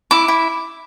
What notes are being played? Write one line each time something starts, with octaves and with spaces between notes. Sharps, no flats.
E4 D6
E4